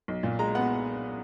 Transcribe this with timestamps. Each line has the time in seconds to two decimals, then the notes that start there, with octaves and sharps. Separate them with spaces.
0.08 B1
0.23 A#2
0.39 G#3 A#5
0.55 B3 F#5